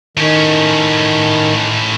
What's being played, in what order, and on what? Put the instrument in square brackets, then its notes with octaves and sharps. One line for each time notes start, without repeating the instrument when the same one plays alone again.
[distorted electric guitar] A2 C#4 [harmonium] D#3